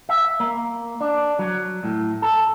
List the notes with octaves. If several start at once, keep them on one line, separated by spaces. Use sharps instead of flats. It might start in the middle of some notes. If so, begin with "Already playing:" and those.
E5
A#3
D4
F#3
A2
A4